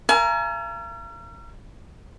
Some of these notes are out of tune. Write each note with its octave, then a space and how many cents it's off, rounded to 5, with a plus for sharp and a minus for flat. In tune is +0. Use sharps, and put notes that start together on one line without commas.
A#4 +0 F5 -45 G#5 +40